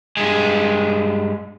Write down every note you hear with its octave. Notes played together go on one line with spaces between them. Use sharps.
G2 G#3